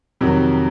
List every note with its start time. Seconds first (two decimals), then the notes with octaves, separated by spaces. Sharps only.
0.21 F2 C3 D#3 F#3